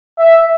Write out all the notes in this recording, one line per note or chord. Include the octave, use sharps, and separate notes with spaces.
E5